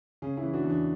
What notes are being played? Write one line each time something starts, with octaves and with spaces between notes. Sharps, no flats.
C#3 C#4
C#4 E4
E3
D4 F#4
E2
D4